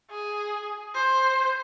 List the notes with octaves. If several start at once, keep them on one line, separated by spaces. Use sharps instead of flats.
G#4
C5